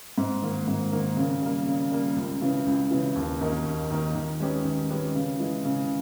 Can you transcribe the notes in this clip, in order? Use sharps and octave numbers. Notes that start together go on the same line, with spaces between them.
G#2
D#3 A#3
G#2
D#3 A#3
C#3
G3 A#3
C#3
G3 A#3
C#2
C#3 E3
C#2
C#3 E3
D#2
D#3 A#3 D#4 A#4
D#2
D#3 A#3 D#4 A#4
D#3
G#3 C#4 G4 B4
D#3
G#3 C#4 G4 B4
C#3
E3 G#3
C#3